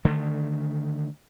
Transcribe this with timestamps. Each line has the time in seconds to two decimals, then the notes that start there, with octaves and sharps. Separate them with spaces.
0.05 D3 D#3 A3